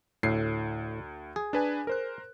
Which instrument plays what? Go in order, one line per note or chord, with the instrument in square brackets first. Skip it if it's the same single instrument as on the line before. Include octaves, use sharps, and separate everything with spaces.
[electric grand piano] D2 C7 [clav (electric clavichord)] A2
[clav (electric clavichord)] G#4
[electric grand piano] D4 B4 G#5
A#4 C5 F#6